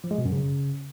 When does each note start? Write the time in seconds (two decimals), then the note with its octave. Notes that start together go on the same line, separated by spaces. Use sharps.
0.04 F3
0.11 G#3
0.18 B2
0.25 F#2
0.32 C#3